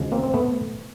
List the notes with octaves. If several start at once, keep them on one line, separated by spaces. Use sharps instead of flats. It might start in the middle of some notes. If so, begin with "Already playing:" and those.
Already playing: D2 C#3 F3 G#3
A#3 C4
C4
A3 B3